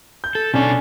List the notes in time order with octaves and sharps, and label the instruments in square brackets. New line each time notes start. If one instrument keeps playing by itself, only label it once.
[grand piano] G6
[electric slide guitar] A4
[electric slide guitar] B2 A4 [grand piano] C#4 D4